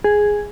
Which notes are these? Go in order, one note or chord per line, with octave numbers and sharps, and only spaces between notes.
G#4